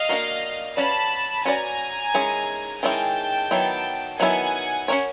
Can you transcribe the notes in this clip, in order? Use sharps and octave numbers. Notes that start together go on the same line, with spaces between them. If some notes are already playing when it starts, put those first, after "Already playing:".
Already playing: D#5 F5
A#3 D4 F#4 A#4
C#4 F#4 B4 D5 A5 B5
C#4 F#4 B4 D5 G#5 A#5
D#3 G#3 C#4 E4 G#4
D#3 G#3 C#4 E4 G#4 G5 A5
D#3 F#3 B3 E4
D#3 F#3 B3 E4 F#5 G#5
C#4 F#4 A#4 C#5